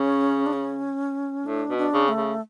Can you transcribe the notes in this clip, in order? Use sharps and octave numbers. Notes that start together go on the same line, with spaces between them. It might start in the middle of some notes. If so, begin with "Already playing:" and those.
Already playing: C#3 C#4
D4
C#4
A2 D4
B2
D4
C#3
A3
C#3